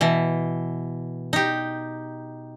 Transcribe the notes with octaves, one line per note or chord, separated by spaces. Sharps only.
B2 E3
D#4 G4